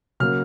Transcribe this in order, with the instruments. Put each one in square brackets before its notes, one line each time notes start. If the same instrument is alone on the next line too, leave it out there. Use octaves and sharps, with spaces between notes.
[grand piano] C#3 F#3 A#3 F6